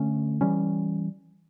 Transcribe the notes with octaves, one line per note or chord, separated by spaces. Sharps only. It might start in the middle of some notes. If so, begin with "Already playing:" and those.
Already playing: D3 A3 C#4
E3 G3 C#4